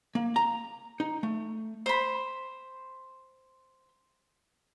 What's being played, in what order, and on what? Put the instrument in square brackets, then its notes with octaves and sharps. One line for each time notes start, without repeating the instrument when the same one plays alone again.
[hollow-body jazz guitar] A#3
A#5
D#4
A3
[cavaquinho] C5 B5